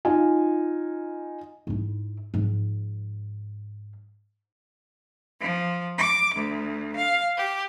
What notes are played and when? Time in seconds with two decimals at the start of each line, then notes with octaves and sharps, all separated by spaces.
0.05 D#4 F4 G#5
1.67 G#2 E4
2.34 G#2 F3
5.39 F3
5.98 D6
6.34 D2
6.96 F5
7.37 G4